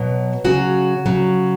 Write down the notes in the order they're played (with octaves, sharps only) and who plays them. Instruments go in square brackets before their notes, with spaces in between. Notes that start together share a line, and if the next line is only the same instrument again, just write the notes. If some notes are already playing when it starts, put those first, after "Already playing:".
Already playing: [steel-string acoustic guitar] B2 F#3
C#3 F#3 F#4
C#3 F#3